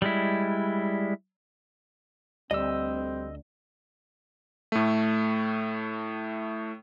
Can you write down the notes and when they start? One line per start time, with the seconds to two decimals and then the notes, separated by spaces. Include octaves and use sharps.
0.02 G3 G#3 E4
2.51 D2 G3 C4 D#5 E6
4.72 A2 A3